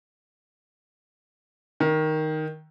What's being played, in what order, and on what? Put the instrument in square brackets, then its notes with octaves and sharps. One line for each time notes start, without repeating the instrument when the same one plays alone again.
[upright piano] D#3